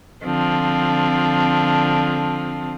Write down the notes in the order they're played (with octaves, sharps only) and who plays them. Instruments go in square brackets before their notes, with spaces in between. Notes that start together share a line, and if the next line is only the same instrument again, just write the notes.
[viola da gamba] D3 F3 C4